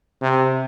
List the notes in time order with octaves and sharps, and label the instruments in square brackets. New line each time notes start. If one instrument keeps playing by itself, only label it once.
[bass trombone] C3